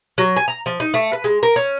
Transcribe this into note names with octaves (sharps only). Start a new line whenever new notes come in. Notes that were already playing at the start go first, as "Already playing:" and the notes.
F#3
G#5
A#5
F3
D#4
A3
B4
G#3
A#4
C#4